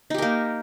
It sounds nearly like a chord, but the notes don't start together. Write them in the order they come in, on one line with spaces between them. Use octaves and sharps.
D#4 G4 A#4 A#3